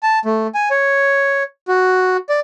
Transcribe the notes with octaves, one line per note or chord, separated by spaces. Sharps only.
A5
A3
G#5
C#5
F#4
D5